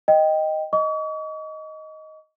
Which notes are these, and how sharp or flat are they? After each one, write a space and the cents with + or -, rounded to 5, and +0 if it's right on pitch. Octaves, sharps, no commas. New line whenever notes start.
D#5 +0 G5 +0
D#5 +5 C#6 +45